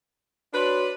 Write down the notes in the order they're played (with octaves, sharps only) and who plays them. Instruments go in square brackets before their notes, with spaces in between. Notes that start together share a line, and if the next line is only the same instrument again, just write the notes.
[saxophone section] D4 B4 [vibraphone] F#4 C#5 C6